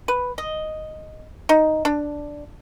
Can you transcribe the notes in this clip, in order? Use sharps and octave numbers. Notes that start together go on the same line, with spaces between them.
B4
D#5
D#4
D4